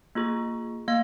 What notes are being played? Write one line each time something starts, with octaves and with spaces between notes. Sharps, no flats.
A#3 F4 G#4
A#3 F5